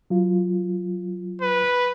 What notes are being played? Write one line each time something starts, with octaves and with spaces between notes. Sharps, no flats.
F#3 F4
B4